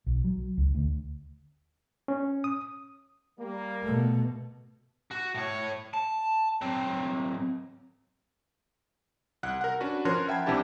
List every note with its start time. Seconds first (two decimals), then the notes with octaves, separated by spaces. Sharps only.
0.06 B1
0.24 F#3
0.58 C#2
0.75 D2
2.08 C#4
2.44 D#6
3.39 G3 A#3
3.83 B2 A3
5.11 F#4
5.34 A2 C#5
5.93 A5
6.61 F#3 C4
9.43 C2 F#5 F#6
9.61 A#4 F#5
9.80 C#4 D4 F#4 B4
10.05 F3 C#4 A#4 C#5 C6 F#6
10.28 E5 F#5 G5 A5 B5 G#6
10.46 C2 C3 E3 D4 G4 A5